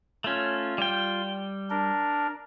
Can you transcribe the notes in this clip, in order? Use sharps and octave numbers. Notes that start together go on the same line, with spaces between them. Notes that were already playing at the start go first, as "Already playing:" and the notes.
A3 C#4 F4
G3 G5
D4 A#4